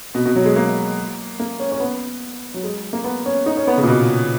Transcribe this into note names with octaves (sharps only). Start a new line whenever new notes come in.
B2
B2
F#3
G#3
A#3
A#3
C#4
C#4
B3
F#3
G#3
A#3
B3
C#4
D#4
C#4
B3
C#3
A#2
B2